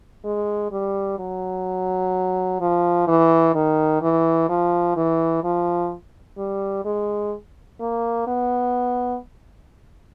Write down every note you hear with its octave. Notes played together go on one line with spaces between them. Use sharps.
G#3
G3
F#3
F3
E3
D#3
E3
F3
E3
F3
G3
G#3
A#3
B3